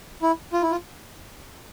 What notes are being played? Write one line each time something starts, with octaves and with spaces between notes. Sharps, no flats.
E4
F4
E4
F4